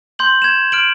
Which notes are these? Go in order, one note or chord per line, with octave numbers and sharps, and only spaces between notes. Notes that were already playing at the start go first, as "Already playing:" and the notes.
C6 G6 F#7
G#6 E7
F6 D7 F#7